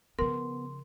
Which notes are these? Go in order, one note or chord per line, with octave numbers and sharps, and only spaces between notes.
C#3 F3 B3 A#4 C6